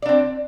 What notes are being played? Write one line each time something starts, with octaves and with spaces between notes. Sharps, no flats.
C4 D4 D5